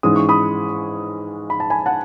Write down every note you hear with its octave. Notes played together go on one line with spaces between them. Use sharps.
G#2 E3 G#3 C#4 D#6
C#6
B5 D#6
B5
A5
G#5 B5
F#5 A5